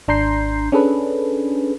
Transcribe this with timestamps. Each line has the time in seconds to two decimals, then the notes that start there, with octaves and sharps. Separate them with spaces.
0.08 G#1 D4 A#5 C6 G6 C7
0.72 C#4 D4 G#4 A4 B4